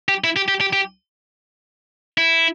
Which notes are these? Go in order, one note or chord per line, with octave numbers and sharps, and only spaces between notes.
G4
E4
G4
G4
G4
G4
E4